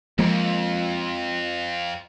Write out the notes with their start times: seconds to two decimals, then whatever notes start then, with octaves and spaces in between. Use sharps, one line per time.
0.19 F2 F3 G#3 A#3